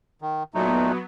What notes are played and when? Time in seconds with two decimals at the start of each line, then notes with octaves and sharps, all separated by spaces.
0.22 D#3
0.54 A#2 F#3 A3 B3 D#4